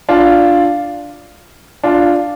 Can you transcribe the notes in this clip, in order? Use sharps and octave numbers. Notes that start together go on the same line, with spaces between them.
D4 F4
D4 F4